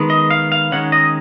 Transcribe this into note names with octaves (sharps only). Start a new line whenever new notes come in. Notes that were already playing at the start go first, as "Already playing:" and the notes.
Already playing: D#3 G#3 B3
D#5
F5
F5
D#3 G#3 C#4 F#5
D#5